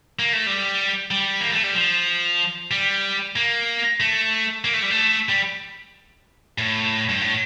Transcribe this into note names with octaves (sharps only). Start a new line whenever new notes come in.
A#3
A3
G3
G3
A#3
A3
G3
F3
G3
A#3
A3
A#3
A3
G3
A3
G3
A2
G2
A2